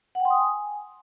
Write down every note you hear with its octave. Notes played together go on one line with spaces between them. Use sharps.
F#5
G5
C6
D#6
G#5